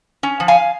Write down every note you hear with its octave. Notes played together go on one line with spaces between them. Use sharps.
C#4
F3
F5 G#5